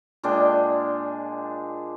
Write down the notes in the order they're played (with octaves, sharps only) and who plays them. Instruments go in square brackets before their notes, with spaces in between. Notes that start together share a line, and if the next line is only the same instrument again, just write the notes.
[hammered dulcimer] A#2 G#3 D4 G5